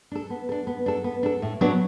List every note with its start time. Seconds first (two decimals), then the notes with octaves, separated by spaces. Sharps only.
0.12 D4 A4
0.30 B3
0.49 D4 A4
0.67 B3
0.86 D4 A4
1.04 B3
1.23 D4 A4
1.42 A2
1.61 F#3 B3 D4